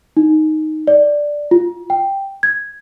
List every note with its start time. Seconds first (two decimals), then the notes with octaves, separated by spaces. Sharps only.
0.17 D#4
0.87 D5
1.51 F4
1.90 G5
2.43 G#6